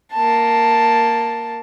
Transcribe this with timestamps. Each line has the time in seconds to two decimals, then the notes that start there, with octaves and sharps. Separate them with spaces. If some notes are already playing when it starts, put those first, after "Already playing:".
0.13 A#3 A5